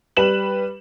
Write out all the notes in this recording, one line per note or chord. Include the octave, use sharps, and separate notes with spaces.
G3 B4 E7 F#7